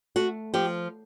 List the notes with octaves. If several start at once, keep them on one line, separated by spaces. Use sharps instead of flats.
A3 F#4
F3 G4